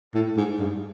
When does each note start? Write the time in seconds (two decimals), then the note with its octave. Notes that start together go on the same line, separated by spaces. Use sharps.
0.14 A2
0.37 G#2
0.59 G2